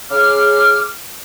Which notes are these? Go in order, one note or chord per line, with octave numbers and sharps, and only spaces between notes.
C#3 G#4 F5 D6 F6